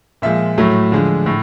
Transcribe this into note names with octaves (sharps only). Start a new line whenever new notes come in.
A#2 F3 G#3 E5
A2 F#3 A3
D3 F3 G#3
A2